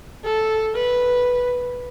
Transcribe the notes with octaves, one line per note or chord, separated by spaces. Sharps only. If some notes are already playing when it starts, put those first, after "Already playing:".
A4
B4